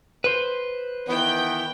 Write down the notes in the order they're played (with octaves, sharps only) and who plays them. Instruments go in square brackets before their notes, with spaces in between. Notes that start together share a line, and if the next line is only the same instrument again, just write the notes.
[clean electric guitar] B4 C5
[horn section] D#3 E3 B3 [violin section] G5